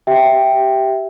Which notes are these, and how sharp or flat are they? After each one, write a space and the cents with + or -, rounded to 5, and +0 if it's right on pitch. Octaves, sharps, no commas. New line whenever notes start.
G4 -10 E5 +0 G5 +0